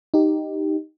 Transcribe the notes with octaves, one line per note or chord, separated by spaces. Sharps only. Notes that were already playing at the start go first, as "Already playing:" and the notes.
D#4 G4